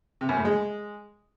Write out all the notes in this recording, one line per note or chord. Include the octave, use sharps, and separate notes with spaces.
C3
F#2
A2
G#3